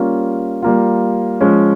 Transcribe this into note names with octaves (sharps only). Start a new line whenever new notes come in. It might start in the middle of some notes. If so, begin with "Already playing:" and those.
Already playing: G3 A#3 C#4 F4
G3 A#3 F4
F3 G#3 C#4